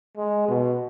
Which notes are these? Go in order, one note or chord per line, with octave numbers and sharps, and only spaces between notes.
G#3
B2